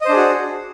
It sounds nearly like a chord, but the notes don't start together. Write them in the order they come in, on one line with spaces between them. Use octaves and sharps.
D#5 C5 D4 G#4 F#4